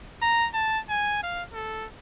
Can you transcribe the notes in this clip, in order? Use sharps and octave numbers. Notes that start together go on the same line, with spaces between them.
A#5
A5
G#5
F5
A4